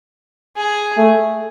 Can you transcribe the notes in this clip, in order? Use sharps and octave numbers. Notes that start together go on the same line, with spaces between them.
G#4
A3